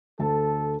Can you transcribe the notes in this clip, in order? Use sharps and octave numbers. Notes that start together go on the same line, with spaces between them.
D2 A4 A5